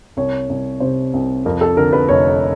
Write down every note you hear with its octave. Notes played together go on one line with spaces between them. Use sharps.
C2 C#5
C2
C3 C5
C2
F2 A#4
A4
D3 A#4
B4
F1 C#5